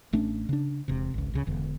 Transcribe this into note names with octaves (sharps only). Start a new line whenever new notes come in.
A1 A3 C#4 D4
C#3 D4
E1 C3
G#1 C#2
C#2 C#3
E1 E2 D3